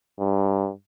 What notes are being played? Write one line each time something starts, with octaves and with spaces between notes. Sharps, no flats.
G2